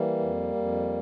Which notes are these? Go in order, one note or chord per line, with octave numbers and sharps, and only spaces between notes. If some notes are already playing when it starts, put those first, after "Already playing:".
Already playing: E3 G3 A#3
F2
F2